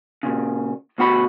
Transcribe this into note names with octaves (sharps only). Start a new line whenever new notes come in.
A#2 C#3
D2 B2 F#4 B5